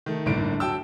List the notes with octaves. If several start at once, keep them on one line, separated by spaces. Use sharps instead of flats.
D#3 A3
G1 A2 D3 A#3 D7
F#3 G5 A5 E6